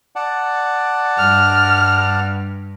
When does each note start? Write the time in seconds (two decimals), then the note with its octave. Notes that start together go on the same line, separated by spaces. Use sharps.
0.16 D5 F#5 A5
1.19 G2 F6